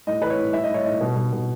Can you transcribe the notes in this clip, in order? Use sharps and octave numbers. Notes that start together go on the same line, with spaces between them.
A2 D#5
E3 B4
C#5
A2
A2 E5
D#5
A2
C#5
A2 D#5
B2
B2
B2